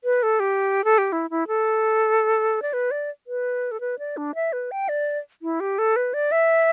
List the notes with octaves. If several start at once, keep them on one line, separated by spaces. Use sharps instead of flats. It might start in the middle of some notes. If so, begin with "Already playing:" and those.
B4
A4
G4
A4
G4
E4
E4
A4
D5
B4
D5
B4
A4
B4
D5
D4
E5
B4
G5
D5
E4
G4
A4
B4
D5
E5